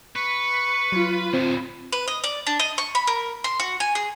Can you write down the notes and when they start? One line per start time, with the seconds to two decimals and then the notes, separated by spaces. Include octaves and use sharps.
0.16 B4 C#6
0.92 F#3 F4
1.33 D2 A2 C4
1.92 B4
2.08 D#5
2.24 D5
2.47 D4
2.59 D#5
2.78 C#6
2.95 B5
3.07 A#4
3.44 C6
3.60 F#4
3.80 G#5
3.95 G#4